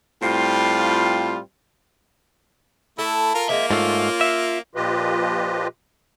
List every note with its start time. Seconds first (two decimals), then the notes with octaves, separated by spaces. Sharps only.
0.22 A2 G3 C4 F4
2.98 A3 E4 A4
3.34 F4 A#4
3.49 F3 G#3 A#3 C4 E5
3.71 G#2 A3 C#4 F4
4.21 E5
4.75 A#2 F3 F4 G4 B4 D#5